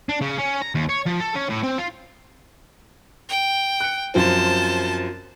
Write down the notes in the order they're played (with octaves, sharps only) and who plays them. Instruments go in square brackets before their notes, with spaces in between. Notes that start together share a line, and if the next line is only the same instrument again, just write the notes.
[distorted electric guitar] D4
C#3
C#4
A#5
D#2
C#5
F3
A4
C#4
A2
C4
F4
[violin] G5
[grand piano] F#6 C#7
[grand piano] F#2 F3 C4 [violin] C5 A5